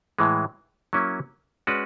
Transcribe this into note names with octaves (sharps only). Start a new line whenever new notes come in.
A2 E3 G#3
F#3 A#3 C#4 E4
G#3 C#4 F#4 B4 D5